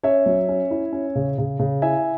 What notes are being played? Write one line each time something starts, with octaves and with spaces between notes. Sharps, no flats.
C#4 C#5 E5
F#3
C#4
E4
C#4
C#3
C#3
C#3
E4 E5 G#5